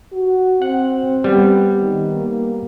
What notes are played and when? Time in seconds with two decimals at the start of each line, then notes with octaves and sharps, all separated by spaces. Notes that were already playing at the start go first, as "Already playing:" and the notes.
0.12 F#4
0.62 C4 F#5
1.24 G3 B3
1.81 D#3
2.17 A#3